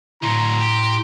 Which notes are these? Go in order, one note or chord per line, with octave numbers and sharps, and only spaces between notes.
D2 A2 F#3 A#5 C6
G4